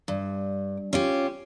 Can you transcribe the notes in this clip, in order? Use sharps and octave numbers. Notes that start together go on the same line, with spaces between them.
G2
C#4 F4 G4